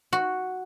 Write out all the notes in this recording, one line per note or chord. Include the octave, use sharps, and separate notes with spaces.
F#4